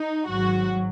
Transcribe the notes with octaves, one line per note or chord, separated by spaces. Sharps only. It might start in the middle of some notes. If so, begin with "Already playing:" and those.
Already playing: D#4
G#1 G#2 F#3 F#4